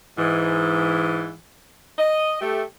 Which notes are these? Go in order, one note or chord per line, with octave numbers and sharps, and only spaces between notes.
G#2 E3
D#5
A3 G4